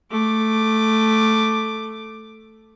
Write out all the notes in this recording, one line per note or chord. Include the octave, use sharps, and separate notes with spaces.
A3 D6